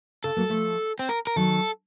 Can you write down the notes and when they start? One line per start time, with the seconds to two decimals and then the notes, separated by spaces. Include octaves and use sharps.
0.24 C#3 A4
0.37 F#3 A#3
0.49 F3 A3
0.99 C4
1.09 A#4
1.27 A#4
1.36 D#3 F#3 A4